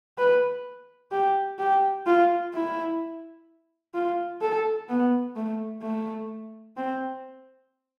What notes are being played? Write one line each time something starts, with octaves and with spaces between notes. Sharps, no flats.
B4
G4
G4
F4
E4
F4
A4
B3
A3
A3
C4